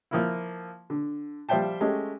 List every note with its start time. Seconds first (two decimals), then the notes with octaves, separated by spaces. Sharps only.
0.11 F3 A#3 E4
0.90 D3
1.49 F3 G3 C5 E5 G5 A5
1.81 G#3 A3 C#4 G4